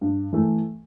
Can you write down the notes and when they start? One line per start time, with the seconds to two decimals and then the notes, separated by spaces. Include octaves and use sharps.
0.01 G2
0.33 E3 A3